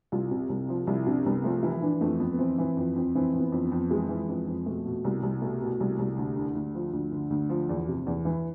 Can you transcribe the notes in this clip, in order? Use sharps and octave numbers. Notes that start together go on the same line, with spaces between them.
C2 F4
C3
C2
F3
C2 E4
C3 D4
C2 B3
F3 A3
E3 E4
E3 D4
F2 A3
F2 B3
B3
E3 C4
E3
F2
F2
E3 C4
E3
B3
F2
B3
F2
E3 G#3
E3
F2
F2
B2 A3
B2
C2 B3
C2
B2 A3
B2
C2
C2
D2
D3
D2
F3
D2
D3
D2
F3
E2
C3
E2
E3